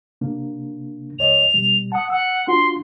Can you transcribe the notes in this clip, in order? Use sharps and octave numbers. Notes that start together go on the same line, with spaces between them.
C3 A#3 D4
C#2 C#5 D#5 F7
B2 G3
F#5 A5 D#6
F#5 E6
D4 F4 F#4 C6